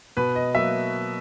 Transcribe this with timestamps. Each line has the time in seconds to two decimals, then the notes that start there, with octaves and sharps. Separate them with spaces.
0.17 B2 B4
0.35 D#5
0.54 F#3 A#3 E5